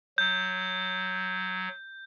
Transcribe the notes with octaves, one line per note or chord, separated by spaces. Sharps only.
F#3 G6